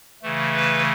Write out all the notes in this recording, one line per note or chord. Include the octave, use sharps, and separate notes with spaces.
C#3 E3 A3
B4